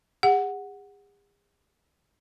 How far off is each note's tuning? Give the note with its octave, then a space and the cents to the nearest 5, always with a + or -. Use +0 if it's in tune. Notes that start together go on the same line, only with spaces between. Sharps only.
G#4 -45 F#5 +0